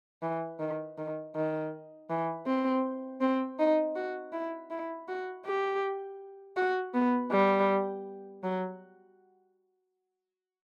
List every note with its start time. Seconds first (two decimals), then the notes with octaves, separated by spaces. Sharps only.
0.22 E3
0.60 D#3
0.98 D#3
1.35 D#3
2.10 E3
2.47 C4
3.21 C4
3.59 D#4
3.96 F#4
4.33 E4
4.71 E4
5.08 F#4
5.46 G4
6.57 F#4
6.94 B3
7.31 G3
8.43 F#3